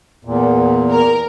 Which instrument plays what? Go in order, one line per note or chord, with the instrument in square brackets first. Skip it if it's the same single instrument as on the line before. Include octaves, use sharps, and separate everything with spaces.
[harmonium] E2 A#2
[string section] A#4